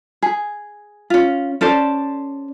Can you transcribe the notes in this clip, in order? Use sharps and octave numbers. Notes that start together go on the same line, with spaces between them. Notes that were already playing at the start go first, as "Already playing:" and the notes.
G#4
C#4 F4
C#4 A4 C5 D5